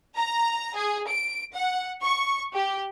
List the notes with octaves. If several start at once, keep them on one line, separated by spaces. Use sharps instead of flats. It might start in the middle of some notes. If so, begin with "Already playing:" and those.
A#5
G#4
D7
F#5
C#6
G4